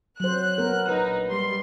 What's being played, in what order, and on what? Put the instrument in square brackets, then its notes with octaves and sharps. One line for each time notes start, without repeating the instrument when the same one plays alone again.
[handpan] F#3 C5 [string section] F#6
[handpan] B3 A#4
[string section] A#1 D#4 [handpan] B4
[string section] G3 C6